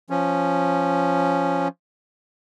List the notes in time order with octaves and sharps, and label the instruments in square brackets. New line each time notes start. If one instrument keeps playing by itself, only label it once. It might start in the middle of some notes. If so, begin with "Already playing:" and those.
[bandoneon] F3 C#4